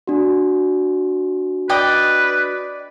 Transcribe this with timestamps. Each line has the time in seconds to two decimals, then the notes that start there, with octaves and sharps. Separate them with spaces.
0.07 D4 F#4
1.69 B4 D5 D#5 G5